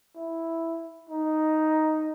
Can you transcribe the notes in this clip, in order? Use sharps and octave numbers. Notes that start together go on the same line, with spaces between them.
E4
D#4